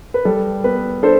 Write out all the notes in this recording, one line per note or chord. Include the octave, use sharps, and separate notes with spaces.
B4
G3 A4
B3 B4
D4 A4 C5